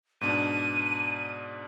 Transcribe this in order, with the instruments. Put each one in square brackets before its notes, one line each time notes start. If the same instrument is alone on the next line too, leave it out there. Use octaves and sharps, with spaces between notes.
[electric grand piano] G#2 B2 D4 [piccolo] D#7